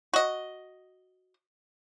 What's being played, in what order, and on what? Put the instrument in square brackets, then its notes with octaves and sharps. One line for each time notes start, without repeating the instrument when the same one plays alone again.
[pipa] F#4 D#5